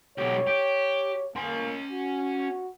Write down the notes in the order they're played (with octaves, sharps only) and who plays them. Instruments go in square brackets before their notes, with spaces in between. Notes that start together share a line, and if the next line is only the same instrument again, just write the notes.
[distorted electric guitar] B1 G4 [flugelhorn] C#5
[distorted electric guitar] G4
[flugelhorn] A#3 [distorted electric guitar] C#4 C6
[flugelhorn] F#4